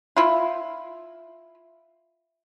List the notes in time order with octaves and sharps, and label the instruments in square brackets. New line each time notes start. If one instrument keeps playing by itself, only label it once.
[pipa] E4 F4